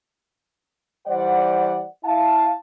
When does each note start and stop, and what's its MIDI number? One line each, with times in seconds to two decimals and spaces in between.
1.07 1.83 52
1.07 1.83 55
1.07 1.83 72
1.07 1.83 74
1.07 1.83 78
2.04 2.54 64
2.04 2.54 77
2.04 2.54 81